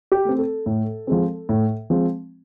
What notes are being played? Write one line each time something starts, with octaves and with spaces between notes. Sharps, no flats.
G4
A3 C4
A4
A2
F3 G#3 C4
A2
F3 G#3 C4